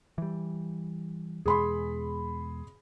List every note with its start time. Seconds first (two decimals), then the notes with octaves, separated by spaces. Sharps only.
0.18 E3 G3
1.46 E2 B2 G#3 G#4 B5 C6